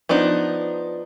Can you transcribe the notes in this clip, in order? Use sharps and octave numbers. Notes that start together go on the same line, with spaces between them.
F3 B3 D4 D#4